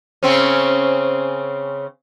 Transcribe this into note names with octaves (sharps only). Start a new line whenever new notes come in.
C#3 C4 C#4